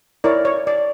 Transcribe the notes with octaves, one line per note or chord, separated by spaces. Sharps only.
E4 A#4 C#5 D5
C#5
D5